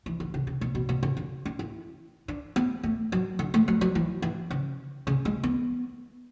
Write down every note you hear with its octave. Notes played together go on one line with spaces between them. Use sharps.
E3
D3
C#3
C#3
B2
B2
B2
C#3
D3
C#4
E4
D4
B3
A3
F#3
D3
A3
F#3
F#3
E3
E3
C#3
C#3
G#3
B3